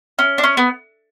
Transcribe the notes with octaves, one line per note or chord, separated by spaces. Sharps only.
C#4
D4
C#4
B3